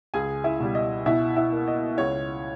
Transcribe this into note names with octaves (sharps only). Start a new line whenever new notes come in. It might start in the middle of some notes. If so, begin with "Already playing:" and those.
C#2 G#4 G#5
E4 E5
B2 G3
D#5
B2 E4 E5
E4 E5
A#3
D#5
C#2 C#5